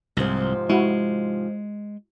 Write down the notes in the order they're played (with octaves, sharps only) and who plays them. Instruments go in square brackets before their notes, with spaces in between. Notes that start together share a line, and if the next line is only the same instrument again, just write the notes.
[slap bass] C2 [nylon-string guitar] G#2 C3 F3
[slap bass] G#3 [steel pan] E4 F#4